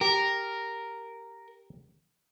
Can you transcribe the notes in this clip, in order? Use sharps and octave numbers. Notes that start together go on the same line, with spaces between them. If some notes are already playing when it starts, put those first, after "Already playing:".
G4 A#4